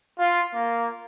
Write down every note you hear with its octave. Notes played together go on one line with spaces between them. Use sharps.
F4
A#3